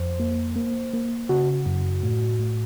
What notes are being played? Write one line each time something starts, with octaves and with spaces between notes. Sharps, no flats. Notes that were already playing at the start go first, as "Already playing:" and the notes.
Already playing: F2 C5
A#3
A#3
A#3
C#3 F#4
F#2
A2
A2